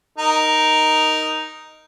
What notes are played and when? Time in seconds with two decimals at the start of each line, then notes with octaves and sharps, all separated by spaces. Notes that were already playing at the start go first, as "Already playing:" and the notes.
0.18 D#4 A#4